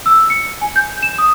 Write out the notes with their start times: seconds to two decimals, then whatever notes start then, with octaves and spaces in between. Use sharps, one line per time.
0.06 E6
0.30 C#7
0.61 G#5
0.76 G6
1.03 E7
1.18 D#6